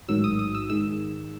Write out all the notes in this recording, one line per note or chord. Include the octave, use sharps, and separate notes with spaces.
A1 G#2 D#3 F#3 E6
D#6
D#6
E6
G#2 D#3 G#3 E6